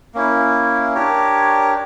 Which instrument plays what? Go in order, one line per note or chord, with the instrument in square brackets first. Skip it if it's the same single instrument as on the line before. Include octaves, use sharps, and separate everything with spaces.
[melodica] A#3 C#4 E4
D4 G4 A#4 C#5